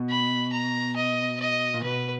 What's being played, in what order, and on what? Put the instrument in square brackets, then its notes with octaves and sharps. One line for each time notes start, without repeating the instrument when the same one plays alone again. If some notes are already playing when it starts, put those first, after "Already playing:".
Already playing: [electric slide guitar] B2
[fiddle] B5
A#5
D#5
D#5
[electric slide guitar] A#2
[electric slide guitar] B2 [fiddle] B4